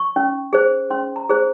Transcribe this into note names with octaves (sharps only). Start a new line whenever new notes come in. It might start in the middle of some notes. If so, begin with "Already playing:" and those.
Already playing: C#6
C#4
G#4 C5
C#4 C6
A#5
G#4 C5